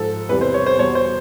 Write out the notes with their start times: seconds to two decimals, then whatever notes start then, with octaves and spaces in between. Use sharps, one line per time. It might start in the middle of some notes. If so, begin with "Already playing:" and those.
Already playing: G#2 F3 A4
0.29 E2 C3 E3 G3 B4
0.41 C5
0.54 C#5
0.66 C5
0.78 E2 B2 G3 C#5
0.95 C5